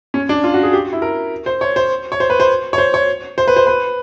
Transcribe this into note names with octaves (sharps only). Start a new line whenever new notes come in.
C#4
D4
F4
F#4
G#4
G4
E4
A#4
C5
C#5
C5
C#5
C5
B4
C5
C#5
C5
C#5
C5
B4
C5
B4